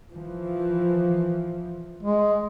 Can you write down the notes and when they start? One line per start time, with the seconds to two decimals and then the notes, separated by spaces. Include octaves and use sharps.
0.12 E3 F3
2.03 G#3